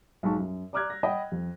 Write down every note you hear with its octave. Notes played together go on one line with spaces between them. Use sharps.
B1 G#2 A5 C#6
F#2
D5 A#5 D6 F6 F#6 G#6
A#6
D#5 F#5 G5 B5
F2